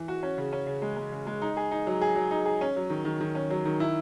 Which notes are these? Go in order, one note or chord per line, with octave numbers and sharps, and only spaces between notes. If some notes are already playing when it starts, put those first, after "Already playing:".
Already playing: E3
F#4
C#4
C#3
C#4
C#3
G#3
G#3
C#3
G#3
D#4
G#4
D#4
F#3
G#4
F#3
D#4
G#4
C#4
F#3
D#3
D#3
D#3
C#4
F#3
D#3
E4